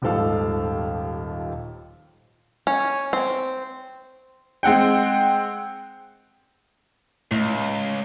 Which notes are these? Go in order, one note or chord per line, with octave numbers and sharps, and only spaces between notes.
D#1 D#2 G#2 F3 A4 F5
C#4
C4
G#3 C4 F#5 G5
C#2 A2